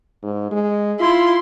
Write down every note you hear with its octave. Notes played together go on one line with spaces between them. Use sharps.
G#2
G#3
E4 F4 C6